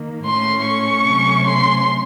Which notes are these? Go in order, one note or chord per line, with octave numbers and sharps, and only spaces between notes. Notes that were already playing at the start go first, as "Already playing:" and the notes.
Already playing: D#3 A#3
A2 A3 C#4 C6
C#6
C3 F#3 A3 C#4
C6